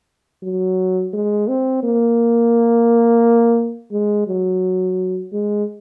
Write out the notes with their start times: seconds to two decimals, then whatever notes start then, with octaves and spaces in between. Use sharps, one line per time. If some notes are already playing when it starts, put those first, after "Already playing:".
0.43 F#3
1.13 G#3
1.48 C4
1.83 A#3
3.92 G#3
4.28 F#3
5.33 G#3